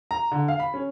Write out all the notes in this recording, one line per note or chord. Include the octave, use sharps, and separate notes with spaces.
A#5
D3
F5
B5
C#4